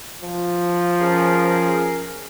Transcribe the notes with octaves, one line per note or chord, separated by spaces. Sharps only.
F3
C#4 G#4 A#4